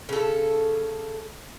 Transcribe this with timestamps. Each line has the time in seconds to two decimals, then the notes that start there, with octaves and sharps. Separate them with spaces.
0.09 C#3 A4